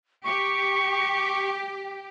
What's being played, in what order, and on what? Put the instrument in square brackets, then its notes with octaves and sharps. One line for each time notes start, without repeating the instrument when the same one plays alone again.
[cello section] G4 [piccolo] C#6